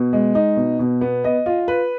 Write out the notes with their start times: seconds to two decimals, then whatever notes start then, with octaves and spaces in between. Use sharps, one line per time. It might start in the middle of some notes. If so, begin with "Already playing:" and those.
Already playing: B2
0.13 G#3
0.35 D#4
0.56 B2
0.79 B2
1.01 B3
1.24 D#5
1.46 F4
1.68 B4